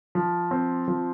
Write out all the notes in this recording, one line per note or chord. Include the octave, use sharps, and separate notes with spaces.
F3
C4
F3